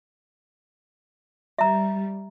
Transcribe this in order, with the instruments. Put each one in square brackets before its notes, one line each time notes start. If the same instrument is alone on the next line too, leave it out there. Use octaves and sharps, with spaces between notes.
[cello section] G3 [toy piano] E5 A#5